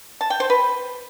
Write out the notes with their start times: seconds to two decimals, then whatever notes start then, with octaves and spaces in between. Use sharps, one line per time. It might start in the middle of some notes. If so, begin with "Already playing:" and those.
0.21 A5
0.30 G5
0.40 C5
0.50 B4